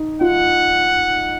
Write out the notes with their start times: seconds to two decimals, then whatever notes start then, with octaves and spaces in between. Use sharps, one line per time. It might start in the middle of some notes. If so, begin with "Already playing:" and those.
Already playing: D#4
0.21 F4 F#5